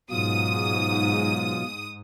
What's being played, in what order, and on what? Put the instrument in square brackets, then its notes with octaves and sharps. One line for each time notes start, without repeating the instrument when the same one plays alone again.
[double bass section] G#2 [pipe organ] B2 F#3 F4 [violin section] D#6